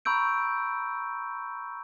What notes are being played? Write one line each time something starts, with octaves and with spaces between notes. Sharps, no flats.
A#5 B5 C#6 E6 G6 D7